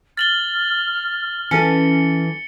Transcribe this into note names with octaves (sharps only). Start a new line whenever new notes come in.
F6 A6 F#7 G7
E3 C#4 A4 C#7